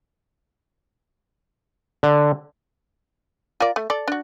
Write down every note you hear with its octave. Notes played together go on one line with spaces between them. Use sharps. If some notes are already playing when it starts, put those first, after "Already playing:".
D3
F4 A#4 D5
A3
A4 D5
D4 F#4